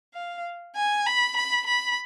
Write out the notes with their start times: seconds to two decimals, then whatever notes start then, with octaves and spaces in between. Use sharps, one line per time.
0.14 F5
0.76 G#5
1.06 B5
1.37 B5
1.67 B5